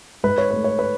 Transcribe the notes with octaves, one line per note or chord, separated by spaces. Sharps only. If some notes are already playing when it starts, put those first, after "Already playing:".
G#2 B4
C#5
A3 B4
C#5
B4